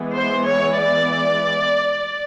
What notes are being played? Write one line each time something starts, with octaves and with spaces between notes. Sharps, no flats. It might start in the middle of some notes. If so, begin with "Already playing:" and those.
Already playing: E3 G#3 B3
C5
C#5
D5